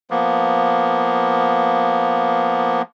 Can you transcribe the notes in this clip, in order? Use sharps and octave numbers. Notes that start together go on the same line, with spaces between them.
F3 A#3 B3